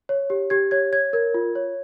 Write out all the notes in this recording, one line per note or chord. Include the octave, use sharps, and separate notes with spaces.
C#5
G4
G4 G#6
C#5 G#6
C#5 G#6
A#4 G#6
F4
C#5